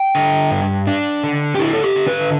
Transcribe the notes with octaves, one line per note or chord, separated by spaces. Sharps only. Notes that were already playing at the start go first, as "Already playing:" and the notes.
Already playing: G5
D3
G2
D4
D3
G4
D3 E4
A4
G4
D3
B4